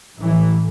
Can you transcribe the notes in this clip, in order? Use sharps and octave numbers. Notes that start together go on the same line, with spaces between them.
A1 A2 E3